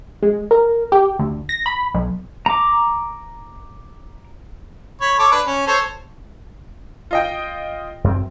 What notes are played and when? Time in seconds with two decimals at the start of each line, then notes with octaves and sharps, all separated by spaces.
0.23 G#3
0.51 A#4
0.92 G4
1.19 D2
1.49 A#6
1.66 B5
1.94 B1
2.46 A#5 D6
5.01 C#5 B5
5.19 A4 C#5 D6
5.32 D4 B4
5.46 C#4
5.67 A4 C5 C#5
7.11 F4 D#5 G5
8.04 F#2 C4